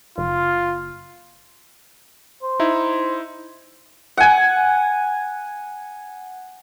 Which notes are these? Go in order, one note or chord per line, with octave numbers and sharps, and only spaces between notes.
F#1 F4
C5
D#4 E4 E5
F#5 G#5